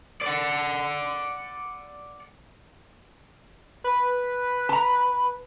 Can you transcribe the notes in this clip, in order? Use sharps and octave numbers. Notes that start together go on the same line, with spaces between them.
D5 F#5
B4
A5 A#5